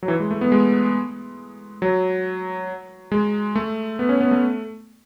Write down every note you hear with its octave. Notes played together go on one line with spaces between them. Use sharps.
F#3
E3
G#3
A3
B3
G#3
F#3
G#3
A3
B3
C#4
B3
A3